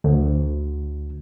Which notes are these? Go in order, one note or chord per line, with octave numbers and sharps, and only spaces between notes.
D2